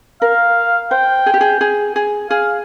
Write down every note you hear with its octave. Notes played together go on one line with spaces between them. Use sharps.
A#4 F5
C5 G5
G#4
G4
G#4
G#4
G#4
G#4 F5